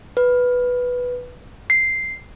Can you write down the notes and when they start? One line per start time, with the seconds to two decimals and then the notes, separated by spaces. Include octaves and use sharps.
0.17 B4
1.70 C7